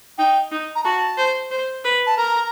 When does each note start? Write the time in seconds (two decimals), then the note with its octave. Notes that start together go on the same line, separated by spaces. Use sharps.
0.18 D#4 G5
0.51 D#4
0.75 A#5
0.84 F#4 A5
1.17 C5
1.51 C5
1.85 B4
2.07 A5
2.17 A#4 A#5